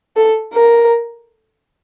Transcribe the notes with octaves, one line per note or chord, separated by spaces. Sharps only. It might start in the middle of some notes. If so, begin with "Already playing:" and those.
A4
A#4